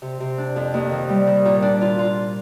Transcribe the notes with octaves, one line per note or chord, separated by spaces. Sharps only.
C3
C3
D4
F2
D#2
D#3
G3
D#3
A#2
D4
F4
F4